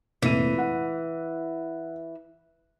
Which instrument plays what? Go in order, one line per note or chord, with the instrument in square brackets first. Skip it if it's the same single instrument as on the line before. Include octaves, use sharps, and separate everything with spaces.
[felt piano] F1 A#2 D#7 [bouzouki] E3
[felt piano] F#5